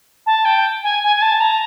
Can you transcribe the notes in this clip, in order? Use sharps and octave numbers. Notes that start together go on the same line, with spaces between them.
A5
G5
G#5
G#5
G#5
A5
A#5